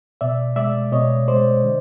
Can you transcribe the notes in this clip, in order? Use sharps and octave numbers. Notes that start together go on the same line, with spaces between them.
B2 D5 E5
G#3 D5 E5
B2 C#5 D#5
G#3 C5 D5
D3